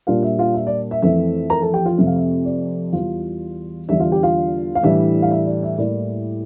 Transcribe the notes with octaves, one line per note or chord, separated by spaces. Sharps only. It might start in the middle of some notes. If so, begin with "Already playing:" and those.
A#2 G3 D4 F4 F5
E5
F4 F5
E5
D5
E5
F2 E3 A3 C4 E5
A#4 A#5
A4 A5
G4 G5
F4 F5
F2 C3 F3 A3 C4 E5
F5
E5
D5
E2 E3 G3 F4 F5
E2 D3 G3 D4 E5
F4 F5
G4 G5
F4 F5
F5
A2 E3 G3 D4 E5
F5
E5
D5
E5
A2 G3 A#3 E4 D5